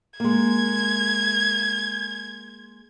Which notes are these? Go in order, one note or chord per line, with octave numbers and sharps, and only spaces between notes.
G#3 A#3 G#6